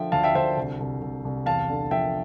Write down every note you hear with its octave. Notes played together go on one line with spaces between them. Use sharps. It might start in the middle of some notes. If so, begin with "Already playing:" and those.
Already playing: D3 F3 E5 G5
D2 F5 A5
E5 G5
D2 C5 E5
C2
C2
C2
C2
E2 F5 A5
D3
F3 E5 G5